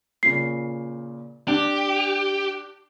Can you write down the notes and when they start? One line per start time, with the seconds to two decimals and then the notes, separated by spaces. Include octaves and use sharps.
0.23 A#2 C#3 C7
1.48 D4 G4